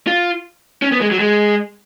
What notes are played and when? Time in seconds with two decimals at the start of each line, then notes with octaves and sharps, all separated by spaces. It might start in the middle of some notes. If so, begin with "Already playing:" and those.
0.07 F4
0.82 C#4
0.92 B3
1.01 G#3
1.11 F#3
1.20 G#3